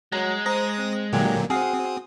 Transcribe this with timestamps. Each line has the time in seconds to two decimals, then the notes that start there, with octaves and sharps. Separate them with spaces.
0.12 F#3 G#3 F#5 A#5
0.46 C5 A#5 D#6 A#6
0.78 C4
1.13 A#2 D3 F#3 A#3 G4 G#5
1.50 C4 F#4 G#4 F5 F#5 D#6